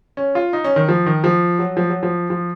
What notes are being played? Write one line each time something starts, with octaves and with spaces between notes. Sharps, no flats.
C#4
F4
D#4
C#4
D#3
F3
D#3
F3
F#3
F3
F#3
F3
F3